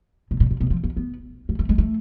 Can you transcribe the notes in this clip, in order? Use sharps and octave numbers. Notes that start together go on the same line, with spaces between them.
B2
A#2
A#2
B2
F3
A#3
B3
A#3
A3
G#3
A3